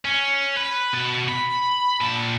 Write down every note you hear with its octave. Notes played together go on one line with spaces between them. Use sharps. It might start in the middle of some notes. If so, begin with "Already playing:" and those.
C#4
B4
B2 A5
B5
A#2 A5